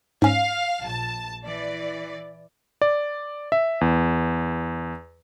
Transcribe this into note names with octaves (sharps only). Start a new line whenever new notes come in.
G#2 C#4 F5
A#1 A5
E3 D5
D5
E5
E2